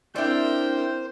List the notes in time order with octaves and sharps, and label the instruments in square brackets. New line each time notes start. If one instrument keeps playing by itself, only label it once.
[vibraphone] C4 D4 E4 [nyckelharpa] A#4 G5 [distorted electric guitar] C5 [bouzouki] D5 E5